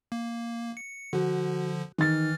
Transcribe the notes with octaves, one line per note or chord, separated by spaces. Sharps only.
A#3
C#7
D3 F3 F#4
D#3 E3 F6 A6